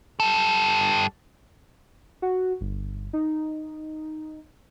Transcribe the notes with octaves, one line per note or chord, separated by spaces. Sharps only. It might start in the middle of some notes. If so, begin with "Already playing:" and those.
G3 A4
F#4
G1
D#4